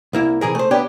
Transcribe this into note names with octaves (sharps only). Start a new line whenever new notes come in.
C2 A#3 E4
C3 E3 G#4 A#4
A3 C5
A#3 B3 D4 G4 C#5 G5